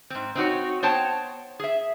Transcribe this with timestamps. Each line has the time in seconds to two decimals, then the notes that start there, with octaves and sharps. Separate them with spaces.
0.10 G#2 C4
0.35 C4 D#4 F#4 C#5
0.83 B3 C5 C#5 G5 A5
1.60 G#4 E5